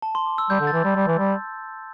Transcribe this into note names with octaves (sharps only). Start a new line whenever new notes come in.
A5
C6
D6
E6
G3 G6
D3
A6
E3
G3
G3
E3
G3